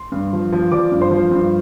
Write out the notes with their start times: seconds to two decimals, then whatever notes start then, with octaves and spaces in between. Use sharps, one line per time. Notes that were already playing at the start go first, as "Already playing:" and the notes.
Already playing: C6
0.12 G2
0.33 F3
0.52 F3
0.72 F3 D5 D6
0.92 G2
1.01 C5 C6
1.11 F3
1.31 G2